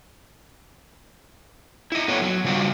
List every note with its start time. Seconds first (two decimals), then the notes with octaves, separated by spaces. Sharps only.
1.92 E4 D#5
2.08 A3 B3 B4 C#5
2.22 F#3
2.44 C#3 G3 F#4 C5